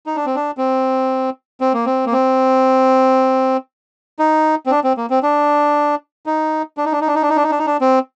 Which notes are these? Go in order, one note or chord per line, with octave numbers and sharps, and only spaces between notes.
D#4
D4
C4
D4
C4
C4
A#3
C4
A#3
C4
D#4
C4
D4
C4
A#3
C4
D4
D#4
D4
D#4
D4
D#4
D4
D#4
D4
D#4
D4
D#4
D4
D#4
D4
C4